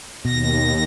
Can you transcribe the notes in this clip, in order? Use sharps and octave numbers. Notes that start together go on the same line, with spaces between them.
D#2 B2 A#6